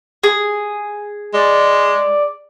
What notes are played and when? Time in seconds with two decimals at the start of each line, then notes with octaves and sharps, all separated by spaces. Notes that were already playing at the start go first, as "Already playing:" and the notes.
0.24 G#4
1.34 G#3 D5